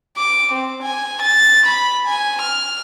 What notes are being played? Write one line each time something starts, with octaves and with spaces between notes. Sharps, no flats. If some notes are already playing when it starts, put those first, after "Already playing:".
D6
C4
G#5
A6
B5
G#5
F6